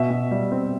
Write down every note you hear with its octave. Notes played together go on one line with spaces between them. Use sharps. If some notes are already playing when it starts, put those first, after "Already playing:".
Already playing: B2 E5
B2
G3
C4